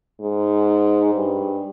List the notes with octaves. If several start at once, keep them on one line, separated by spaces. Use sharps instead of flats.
G#2
G2